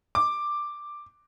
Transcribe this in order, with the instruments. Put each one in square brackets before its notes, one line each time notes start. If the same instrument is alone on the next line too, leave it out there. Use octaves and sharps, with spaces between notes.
[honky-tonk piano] D6